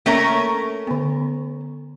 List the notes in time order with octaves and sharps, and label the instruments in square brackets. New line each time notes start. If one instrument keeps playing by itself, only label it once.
[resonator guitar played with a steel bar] A3 C#4 A#4 [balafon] A#3 E5
[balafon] D3 B3